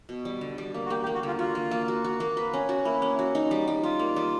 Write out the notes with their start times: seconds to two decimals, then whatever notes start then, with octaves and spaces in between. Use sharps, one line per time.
0.09 B2
0.25 G3
0.41 D3
0.58 G3
0.74 A#3
0.85 F#4
0.90 A#3 G4
1.03 G4
1.07 A#3
1.14 F#4
1.23 D3 F4
1.39 F4 F#4
1.55 A#3
1.71 A#3
1.88 F#4
2.04 F#4
2.20 A#3
2.37 B4
2.53 C#4
2.69 F#4
2.85 A#3 E4
3.02 C#4
3.19 F#4
3.35 D#4
3.51 G3
3.68 G3
3.83 G3 F4
3.99 A#3
4.16 G3